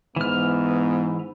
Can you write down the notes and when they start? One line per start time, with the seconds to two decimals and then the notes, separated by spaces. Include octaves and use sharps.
0.16 G#2 E3 B3 F6